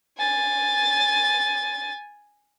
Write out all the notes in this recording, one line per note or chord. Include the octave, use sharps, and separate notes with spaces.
G#5 A6